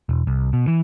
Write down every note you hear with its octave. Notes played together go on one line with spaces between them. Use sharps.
E1
C2
B2
E3